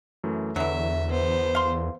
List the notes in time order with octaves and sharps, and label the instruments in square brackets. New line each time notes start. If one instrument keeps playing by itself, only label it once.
[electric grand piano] F#2 E3 A3
[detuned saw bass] E2 [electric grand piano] D3 [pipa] E3 F#3 [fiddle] E5
[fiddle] B3 C5
[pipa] F5 C6